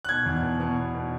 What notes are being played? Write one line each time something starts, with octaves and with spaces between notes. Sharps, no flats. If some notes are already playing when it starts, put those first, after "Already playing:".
F#6
B2 G#6
E2
B2
B2
B2
B2